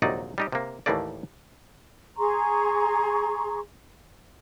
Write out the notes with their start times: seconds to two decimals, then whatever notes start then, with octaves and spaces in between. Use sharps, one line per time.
0.02 A#1 D#2 C3 F#3 D#4 D5
0.38 G3 D#4 G4
0.52 C3 A#3
0.86 D#2 A2 E3 A3 A#3 D5
2.17 G#4 A#5 C6 C#6